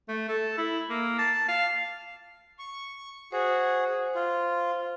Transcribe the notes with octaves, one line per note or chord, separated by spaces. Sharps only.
A3
A4
E4
A#3
A5
F5
C#6
F#4 G#4 C5
F4